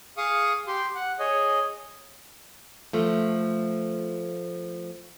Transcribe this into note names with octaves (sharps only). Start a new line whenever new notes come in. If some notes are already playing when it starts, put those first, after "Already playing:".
G#4 F5 C#6 D#6
G4 C6
F#5
G#4 C#5 D#5
F3 A3